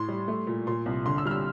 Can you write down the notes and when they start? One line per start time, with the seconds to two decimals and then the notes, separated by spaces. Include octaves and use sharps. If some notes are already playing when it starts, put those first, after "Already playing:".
Already playing: A2 C6
0.08 G3
0.28 A3
0.47 A#2
0.67 A#2 C6
0.86 C2
1.06 D3 C6
1.18 E6
1.25 G3 F6
1.31 E6